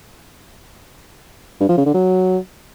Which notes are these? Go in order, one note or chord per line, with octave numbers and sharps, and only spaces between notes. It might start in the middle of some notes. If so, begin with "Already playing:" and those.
G2
F3
C#3
D3
F#3